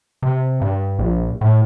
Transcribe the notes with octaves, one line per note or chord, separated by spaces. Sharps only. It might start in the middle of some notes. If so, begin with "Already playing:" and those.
C3
G2
A#1
A2